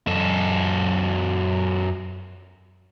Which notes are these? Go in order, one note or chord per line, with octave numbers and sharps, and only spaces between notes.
F#2 A4